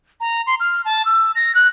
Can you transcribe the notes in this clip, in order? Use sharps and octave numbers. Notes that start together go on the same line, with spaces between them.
A#5
C6
F6
A5
E6
A#6
F#6